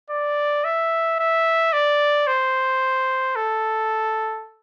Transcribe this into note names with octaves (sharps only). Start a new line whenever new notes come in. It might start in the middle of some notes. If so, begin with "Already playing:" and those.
D5
E5
E5
D5
C5
A4